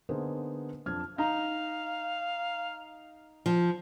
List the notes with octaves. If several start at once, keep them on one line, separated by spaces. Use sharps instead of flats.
D3 A#3 B3 D#4 G#4 C5
F2 D4 F6 G#6
D#4 F5 A#5
F3